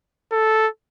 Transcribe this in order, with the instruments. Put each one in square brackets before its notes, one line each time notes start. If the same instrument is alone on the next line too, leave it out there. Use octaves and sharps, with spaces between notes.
[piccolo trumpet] A4